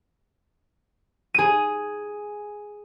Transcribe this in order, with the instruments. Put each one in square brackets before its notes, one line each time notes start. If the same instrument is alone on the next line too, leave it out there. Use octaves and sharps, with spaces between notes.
[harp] G#4 D#7